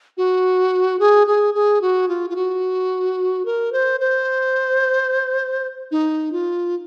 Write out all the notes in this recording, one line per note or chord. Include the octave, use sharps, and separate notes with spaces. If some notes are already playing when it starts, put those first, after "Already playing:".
F#4
G#4
G#4
G#4
F#4
F4
F4
F#4
A#4
C5
C5
D#4
F4